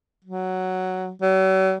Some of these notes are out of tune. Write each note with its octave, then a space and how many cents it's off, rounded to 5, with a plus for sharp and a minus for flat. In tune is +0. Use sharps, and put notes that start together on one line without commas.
F#3 +5
F#3 +45